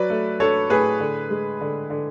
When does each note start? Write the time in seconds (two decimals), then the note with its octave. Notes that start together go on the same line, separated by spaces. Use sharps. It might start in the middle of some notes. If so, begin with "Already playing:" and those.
Already playing: F#3 B4 D5
0.10 A3
0.40 D4 A4 C#5
0.70 A2 G#4 B4
1.00 D3
1.30 G#3
1.61 D3
1.90 D3